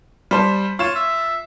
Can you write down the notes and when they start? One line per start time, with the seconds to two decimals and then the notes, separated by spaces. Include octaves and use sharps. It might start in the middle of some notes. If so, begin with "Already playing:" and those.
0.31 G3 C5 A5
0.79 F4 C#5 E7
0.96 E5